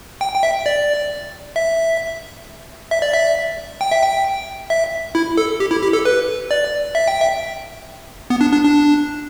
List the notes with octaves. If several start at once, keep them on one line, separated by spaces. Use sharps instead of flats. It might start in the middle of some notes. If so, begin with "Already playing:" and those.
G5
G5
E5
D5
E5
E5
D5
E5
G5
E5
G5
E5
E4
A4
G4
E4
G4
A4
B4
D5
E5
G5
E5
B3
D4
D4
D4